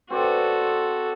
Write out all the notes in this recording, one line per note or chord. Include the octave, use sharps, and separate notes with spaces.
C4 F#4 A4 B4 D5